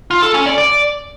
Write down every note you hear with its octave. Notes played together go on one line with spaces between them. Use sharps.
F4
A4
C#4
D5
D5